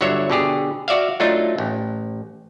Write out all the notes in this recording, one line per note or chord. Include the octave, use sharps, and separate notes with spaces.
G1 D3 F#3 C#5 E5
B2 D3 G4 G#4
F#4 D5 E5 F5
F#3 A3 D4 D#4 F4
A1